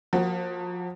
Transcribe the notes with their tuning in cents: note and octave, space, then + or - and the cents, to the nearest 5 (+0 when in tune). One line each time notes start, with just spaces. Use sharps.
F3 +30 A#3 +0 F#4 +15